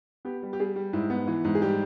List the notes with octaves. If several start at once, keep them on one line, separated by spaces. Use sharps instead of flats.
B3 G4
G3
G4
G3 G#4
G3
G#2 E4
B3
E3
G#2
G#4
G3 G4